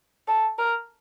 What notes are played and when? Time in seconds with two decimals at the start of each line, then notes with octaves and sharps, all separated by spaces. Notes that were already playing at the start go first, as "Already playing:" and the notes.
0.28 A4
0.59 A#4